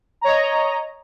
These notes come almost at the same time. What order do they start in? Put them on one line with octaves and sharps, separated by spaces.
A#5 C#5 D#5